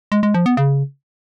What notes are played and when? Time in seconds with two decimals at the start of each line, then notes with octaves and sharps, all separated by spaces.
0.12 G#3
0.23 G#3
0.34 F3
0.46 B3
0.57 C#3